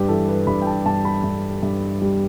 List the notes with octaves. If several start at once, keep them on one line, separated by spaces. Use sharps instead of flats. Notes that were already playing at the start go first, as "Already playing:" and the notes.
Already playing: G2 G4 B4
E3 A4
B4
G2 B5
G5
A5
G2 A5
B5
G2
G2
G3